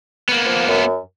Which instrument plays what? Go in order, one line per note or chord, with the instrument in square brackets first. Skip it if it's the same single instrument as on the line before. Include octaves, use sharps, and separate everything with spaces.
[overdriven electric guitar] A#3 B3
[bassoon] F3
F#2